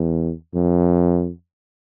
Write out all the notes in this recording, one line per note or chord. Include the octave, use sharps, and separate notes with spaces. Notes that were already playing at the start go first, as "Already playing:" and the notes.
Already playing: E2
F2